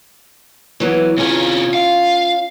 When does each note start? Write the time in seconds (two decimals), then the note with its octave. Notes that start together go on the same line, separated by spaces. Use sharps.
0.80 E3 F#3 B3
1.18 C3 C#4 F4 G#4
1.74 F5